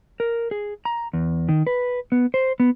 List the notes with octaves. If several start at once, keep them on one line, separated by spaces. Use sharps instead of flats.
A#4
G#4
A#5
E2
D#3
B4
B3
C5
B3